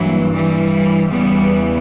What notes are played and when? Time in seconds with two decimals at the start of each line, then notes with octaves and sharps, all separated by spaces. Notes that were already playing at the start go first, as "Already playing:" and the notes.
Already playing: G2 E3 F#3 A#3
0.32 E3 G3
1.09 E2 C#3 E3 G3 B3